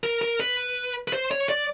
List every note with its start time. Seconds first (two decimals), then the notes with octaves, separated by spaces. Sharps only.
0.03 A#4
0.22 A#4
0.40 B4
1.08 B4
1.13 C5
1.31 C#5
1.49 D5